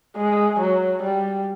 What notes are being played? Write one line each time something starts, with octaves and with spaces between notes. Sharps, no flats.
G#3
F#3
G3